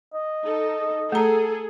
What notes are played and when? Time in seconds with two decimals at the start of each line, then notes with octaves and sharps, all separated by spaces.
0.14 D#5
0.44 D#4 A4
1.12 A3 G#4 A4 A#5